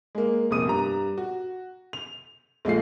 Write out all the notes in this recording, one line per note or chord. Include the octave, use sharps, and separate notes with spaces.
G#3 A#3
F1 A#1 A#4 D#6 D#7
G2 A#5
F#4
F7
A#1 G#3 A3 F4 C7